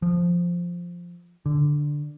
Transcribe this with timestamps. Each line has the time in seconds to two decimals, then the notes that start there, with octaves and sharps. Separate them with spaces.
0.02 F3
1.46 D3